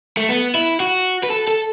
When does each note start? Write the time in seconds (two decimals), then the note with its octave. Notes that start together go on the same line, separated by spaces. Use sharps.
0.17 A3
0.29 B3
0.55 E4
0.80 F#4
1.23 B4
1.30 A4
1.48 A4